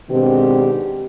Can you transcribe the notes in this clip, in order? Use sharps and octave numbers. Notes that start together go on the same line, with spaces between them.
G#2 B2 D#3 C4 D4 G4